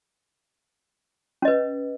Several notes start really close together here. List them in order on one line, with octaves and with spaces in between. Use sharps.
C#4 D#5 B4